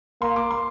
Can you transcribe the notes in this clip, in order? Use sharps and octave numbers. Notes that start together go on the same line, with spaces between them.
A#3 C6
D6
C6